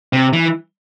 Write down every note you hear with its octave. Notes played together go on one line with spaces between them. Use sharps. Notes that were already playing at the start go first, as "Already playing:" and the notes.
C3
E3